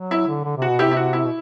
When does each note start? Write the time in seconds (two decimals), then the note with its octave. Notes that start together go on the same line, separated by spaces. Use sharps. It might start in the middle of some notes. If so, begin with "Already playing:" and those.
Already playing: F#3
0.11 E4
0.27 D3
0.44 D3
0.57 C3 F#4
0.69 B2
0.79 C3 E4 G4
0.91 E4
0.96 F#4
1.13 E4
1.25 B2